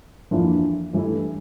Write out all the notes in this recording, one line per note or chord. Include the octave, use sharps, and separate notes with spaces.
F2 E3 A#3 D4 F4
G2 E3 A3 E4